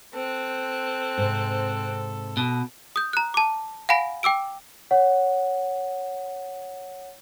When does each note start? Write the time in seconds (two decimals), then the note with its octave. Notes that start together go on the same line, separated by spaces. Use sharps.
0.14 C4 A4 F#6
1.18 G#2 C3
2.37 B2
2.96 D#6 G6
3.13 A#5 F#6
3.34 A5 D6
3.89 F5 F#5 G#5 B5 A#6 D7
4.23 G5 D6 E6 D7
4.91 C#5 F#5